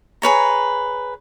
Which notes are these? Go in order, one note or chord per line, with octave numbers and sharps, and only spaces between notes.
G#4 B4 C#5 A#5